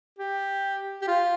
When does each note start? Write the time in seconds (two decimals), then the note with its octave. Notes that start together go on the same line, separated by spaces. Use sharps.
0.19 G4
1.02 G4
1.08 F4